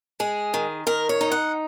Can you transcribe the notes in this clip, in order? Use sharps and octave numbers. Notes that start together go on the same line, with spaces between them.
G#3 G#4
D#3
D#3 A#4
C#5
D#4
F#5